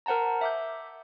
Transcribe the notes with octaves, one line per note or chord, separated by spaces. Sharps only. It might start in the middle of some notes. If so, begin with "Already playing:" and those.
A#4 C5 F#5 A5 A#5
E5 D6 G6